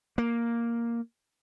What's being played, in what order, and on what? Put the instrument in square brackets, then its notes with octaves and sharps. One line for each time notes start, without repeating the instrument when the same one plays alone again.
[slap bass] A#3